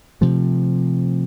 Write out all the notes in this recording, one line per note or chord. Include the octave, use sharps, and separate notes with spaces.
C3 F3 A3